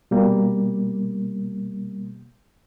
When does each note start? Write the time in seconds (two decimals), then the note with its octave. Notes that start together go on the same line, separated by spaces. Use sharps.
0.11 B2 G3 A#3